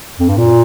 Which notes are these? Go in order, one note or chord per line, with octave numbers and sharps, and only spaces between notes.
F2
G2
A#2